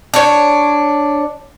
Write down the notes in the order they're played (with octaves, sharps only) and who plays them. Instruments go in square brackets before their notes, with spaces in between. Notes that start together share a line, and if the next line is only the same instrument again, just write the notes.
[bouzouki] D4 C#5